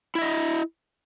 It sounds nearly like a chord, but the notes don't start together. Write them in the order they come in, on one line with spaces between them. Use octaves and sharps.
E4 E5 D#5